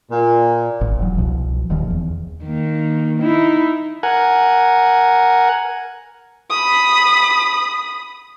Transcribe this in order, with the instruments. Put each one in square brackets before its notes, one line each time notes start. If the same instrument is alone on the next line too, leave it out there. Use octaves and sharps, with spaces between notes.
[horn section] A#2
[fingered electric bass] G#1
E1 F#3
C2 B2 F3
D#1 D#2 D#3 F3
E2
[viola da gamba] D#3 A#3
D#4 E4
[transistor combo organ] A#4 F#5 G#5
[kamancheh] B5 D#6